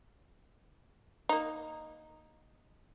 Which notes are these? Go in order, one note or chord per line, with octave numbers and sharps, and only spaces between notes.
A#3 D#4